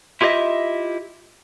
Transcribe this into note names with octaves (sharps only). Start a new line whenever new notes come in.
E4 F4 G4 C#5 D#5 E5